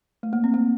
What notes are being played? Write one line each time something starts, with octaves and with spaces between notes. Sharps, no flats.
A3
A#3
C4
A#3